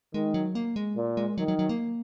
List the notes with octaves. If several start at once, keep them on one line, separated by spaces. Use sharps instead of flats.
D#3 G#3
F#3
A#3
G#3
A#2
G#3
D#3 F#3
F#3
F#3
A#3